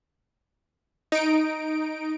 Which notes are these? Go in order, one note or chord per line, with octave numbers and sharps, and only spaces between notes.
D#4 D7